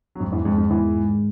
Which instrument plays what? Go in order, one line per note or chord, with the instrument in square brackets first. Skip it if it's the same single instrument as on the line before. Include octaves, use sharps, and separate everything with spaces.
[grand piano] F#3
[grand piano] F2 F3 [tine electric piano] G#2
[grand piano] E2 E3
[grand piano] F2 F3 [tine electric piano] G#3
[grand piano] F2 F3
[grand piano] E2 E3 [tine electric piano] D#3
[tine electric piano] G#2